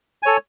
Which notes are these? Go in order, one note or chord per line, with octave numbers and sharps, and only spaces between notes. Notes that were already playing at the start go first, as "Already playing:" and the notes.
A4 C#5 G#5